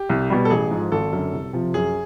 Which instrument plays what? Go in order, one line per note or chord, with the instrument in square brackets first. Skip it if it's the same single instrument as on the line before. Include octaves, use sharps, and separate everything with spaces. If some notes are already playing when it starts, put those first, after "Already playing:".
Already playing: [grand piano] G4
[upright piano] C2
B2 G3
[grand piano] A4
[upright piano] A1 [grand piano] G#4
[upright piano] G#2 F3
[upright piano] G#1 [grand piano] A4
[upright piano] F#2 D3
C2
C3 F3
[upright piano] F#2 [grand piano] G#4